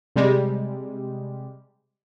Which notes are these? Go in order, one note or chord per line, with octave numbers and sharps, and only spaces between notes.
C3 G3 G#3